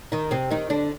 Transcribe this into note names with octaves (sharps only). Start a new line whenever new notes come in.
D#3 D#4
C3 C4
D#3 D#4
D3 D4